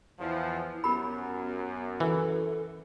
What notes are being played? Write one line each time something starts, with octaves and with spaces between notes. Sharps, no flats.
E2 F3 E4
F#2 B3 G4 A#4 B5
E3 A4